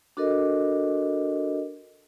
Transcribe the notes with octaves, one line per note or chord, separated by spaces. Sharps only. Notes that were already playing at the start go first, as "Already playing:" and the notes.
D4 F#4 A4 A#4 D#5